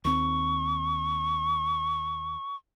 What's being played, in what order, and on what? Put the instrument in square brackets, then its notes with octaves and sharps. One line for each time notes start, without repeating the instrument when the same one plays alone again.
[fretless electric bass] D#2 C4 [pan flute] C#6